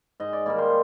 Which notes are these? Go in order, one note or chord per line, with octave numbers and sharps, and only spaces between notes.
G#2 D#5
D5
D#3 G3 A#3 D5
C5